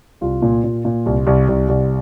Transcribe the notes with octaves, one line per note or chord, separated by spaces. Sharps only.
C2 F4
A#2
A#2
A#2
C2
C2
C2
C2